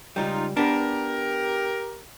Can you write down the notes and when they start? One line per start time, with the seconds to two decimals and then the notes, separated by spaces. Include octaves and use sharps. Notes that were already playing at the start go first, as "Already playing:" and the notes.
0.16 C#2 F#2 G3 D#4 F4
0.57 B3 D4 G4 A#4